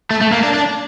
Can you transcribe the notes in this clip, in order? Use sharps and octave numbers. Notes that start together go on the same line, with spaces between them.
A3
A3
A#3
D4
D4